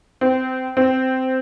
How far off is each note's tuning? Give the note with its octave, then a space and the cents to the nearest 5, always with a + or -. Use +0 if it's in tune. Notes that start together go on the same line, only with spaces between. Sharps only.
C4 -20
C4 -10